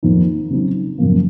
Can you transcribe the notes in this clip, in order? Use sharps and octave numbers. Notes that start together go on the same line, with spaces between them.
F2 D#3 A#3 D#4
C#3 F#3 C4 D#4
F#2 C#3 F3 A#3